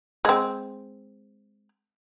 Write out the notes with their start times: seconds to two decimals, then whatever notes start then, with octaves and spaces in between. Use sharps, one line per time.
0.25 G#3 C4